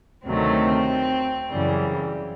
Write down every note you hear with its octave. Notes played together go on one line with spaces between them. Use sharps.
D2 C3 D#3 F#3 A3 C4
F#2 C#3 E3 G3